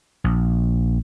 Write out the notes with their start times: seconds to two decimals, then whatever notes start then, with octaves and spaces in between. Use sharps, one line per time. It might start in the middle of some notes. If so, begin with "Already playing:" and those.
0.24 A#1